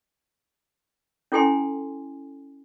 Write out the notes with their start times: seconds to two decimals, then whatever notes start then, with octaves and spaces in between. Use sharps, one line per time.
1.32 C#4 E4 A4 G5 G#5 C6